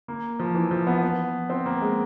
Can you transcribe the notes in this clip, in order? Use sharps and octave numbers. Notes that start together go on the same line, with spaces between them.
A#3
F3
E3
F3
B3
B3
C4
A#3
G#3